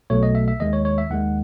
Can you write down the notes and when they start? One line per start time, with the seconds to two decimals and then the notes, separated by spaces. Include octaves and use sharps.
0.10 B1 B2 A3 C#5
0.23 D#5
0.35 E5
0.48 E5
0.60 D#2 D#3 G#3 D#5
0.73 C#5
0.85 C#5
0.98 E5
1.10 D#2 D#3 G#3 F#5